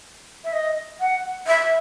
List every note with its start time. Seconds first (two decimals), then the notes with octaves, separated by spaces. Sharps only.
0.44 E5
0.53 D#5
1.00 F#5
1.47 E5